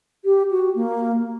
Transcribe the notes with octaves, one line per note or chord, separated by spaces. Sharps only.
G4
F#4
A#3